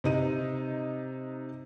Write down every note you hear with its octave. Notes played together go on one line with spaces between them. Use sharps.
C3 D#4 D#7